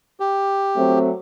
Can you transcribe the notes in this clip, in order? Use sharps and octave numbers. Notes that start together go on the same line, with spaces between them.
G4
F#3 A3 C4